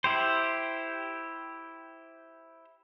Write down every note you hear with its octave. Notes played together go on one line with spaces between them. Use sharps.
E4 G4 C5